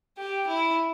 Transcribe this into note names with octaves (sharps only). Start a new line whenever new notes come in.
G4
E4